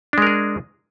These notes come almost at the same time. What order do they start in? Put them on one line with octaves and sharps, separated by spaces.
D4 G#3 A#4 G#4